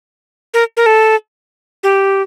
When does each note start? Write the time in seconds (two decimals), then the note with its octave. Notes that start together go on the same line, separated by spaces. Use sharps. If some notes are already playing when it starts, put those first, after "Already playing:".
0.54 A#4
0.77 A#4
0.86 A4
1.83 G4